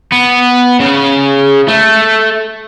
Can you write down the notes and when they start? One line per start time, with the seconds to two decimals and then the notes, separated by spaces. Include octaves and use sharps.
0.12 B3
0.80 C#3
1.68 A3